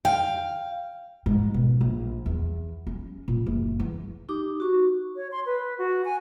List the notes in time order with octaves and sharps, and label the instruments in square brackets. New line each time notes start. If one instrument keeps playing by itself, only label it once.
[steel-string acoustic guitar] F5 [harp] G5
[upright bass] G#2
B2
A#1
E2
C#4
A#2
F#1
E3
[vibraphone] D#4 G4 D6
F#4 C#6
[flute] C#5
C6
B4
F#4
G#5